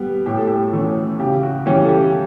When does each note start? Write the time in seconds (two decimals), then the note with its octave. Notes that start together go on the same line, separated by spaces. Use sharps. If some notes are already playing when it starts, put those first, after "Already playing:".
Already playing: G3 B3
0.26 A2 G4
0.37 A4
0.47 G4
0.73 E3 A3 C#4 F#4 A4
1.20 C#3 G4
1.43 F#4
1.66 E3 G3 C#4 G4
1.85 A4
1.89 G4